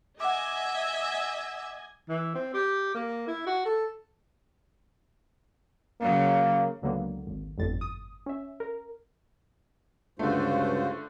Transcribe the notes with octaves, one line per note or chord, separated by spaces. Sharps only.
D#5 E5 F#5 G#5 D6
E3
C4
G4
A#3
E4
F#4
A4
C#3 F#3 A#3
C#2 D3 F#3 A#3 B3
G#1
G1 F2 A2 A6
D#6
C#4 E5
A#4
C#2 G2 D3 A3 F4 F#4 C5